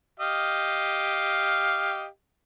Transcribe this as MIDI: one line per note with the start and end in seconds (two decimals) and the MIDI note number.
0.20 2.05 67
0.20 2.05 75
0.20 2.05 77